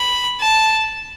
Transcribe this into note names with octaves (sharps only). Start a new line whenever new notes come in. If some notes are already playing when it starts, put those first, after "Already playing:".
Already playing: B5
A5